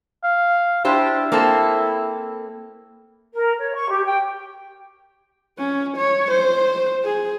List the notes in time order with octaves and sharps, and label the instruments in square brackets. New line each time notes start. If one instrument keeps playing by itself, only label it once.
[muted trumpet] F5
[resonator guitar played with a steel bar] D4 G4 C5 [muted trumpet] E4
[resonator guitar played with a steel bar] A#3 C4 A4
[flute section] A#4
C#5
C#6
G4
G5
[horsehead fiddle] C#4
C#5
C5
G#4